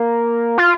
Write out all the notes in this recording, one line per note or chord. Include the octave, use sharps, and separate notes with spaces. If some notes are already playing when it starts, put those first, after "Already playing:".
Already playing: A#3
F4